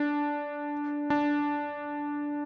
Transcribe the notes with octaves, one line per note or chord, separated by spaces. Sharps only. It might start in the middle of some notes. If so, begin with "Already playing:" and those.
Already playing: D4
D4